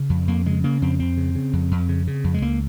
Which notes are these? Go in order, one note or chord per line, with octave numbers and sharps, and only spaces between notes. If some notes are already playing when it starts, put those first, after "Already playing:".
Already playing: C#3
F2
F2 A#3
C#3 G#3
C#3 A#3
F2 C4
F2 C4
C#3
C#3
F2
F2
C#3
C#3
F2
G#3
C#2 A#3